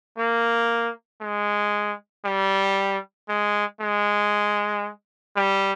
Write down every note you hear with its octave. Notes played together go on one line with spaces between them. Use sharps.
A#3
G#3
G3
G#3
G#3
G3